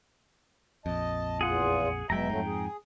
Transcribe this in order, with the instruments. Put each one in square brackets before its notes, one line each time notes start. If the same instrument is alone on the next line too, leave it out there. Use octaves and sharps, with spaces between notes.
[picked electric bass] A#1 F2 [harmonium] D#5 A5
[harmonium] E2 F4 [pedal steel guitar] G#4 F#5
[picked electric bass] F1 F#3 G#3 [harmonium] B2 E5 [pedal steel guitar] G5 A#5
[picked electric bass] F2 G#2 [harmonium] F#3 A3
[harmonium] G#4